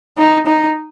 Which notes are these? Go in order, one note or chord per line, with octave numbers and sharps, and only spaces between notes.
D#4
D#4